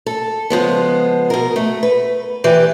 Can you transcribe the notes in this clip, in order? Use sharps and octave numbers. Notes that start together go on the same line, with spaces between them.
A4
C#3 F3 G#3 B3
B2 A#4
A3
B4
E3 G4 B4 D5